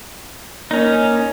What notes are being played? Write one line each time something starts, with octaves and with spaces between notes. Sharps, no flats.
A#3 C#4 D#4